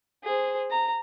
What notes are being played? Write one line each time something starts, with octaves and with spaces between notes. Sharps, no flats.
G#4 C5
A#5